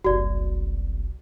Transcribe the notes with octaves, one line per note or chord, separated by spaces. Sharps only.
F#1 C2 F#4 D5